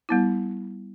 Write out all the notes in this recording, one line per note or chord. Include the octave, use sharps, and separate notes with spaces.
G3 B3 E4